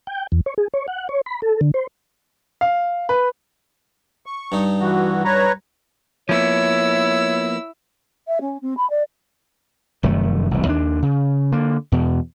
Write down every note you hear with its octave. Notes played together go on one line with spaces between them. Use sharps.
G5
E2
C#5
G#4
C#5
F#5
C#5
B5
A4
D3
C5
F5
B4
C#6
G2 D#4
E3 F#4
B4 C#5 A#5
F3 A#3 B3 E4 C#5 E6
E5
C#4
C4
B5
D5
F1 F#2 D#3 A3
E1 C2
D#2 D4
C#3
D3 A#3
E2 B2